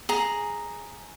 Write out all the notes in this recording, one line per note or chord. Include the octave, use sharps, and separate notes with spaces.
G#4 A#5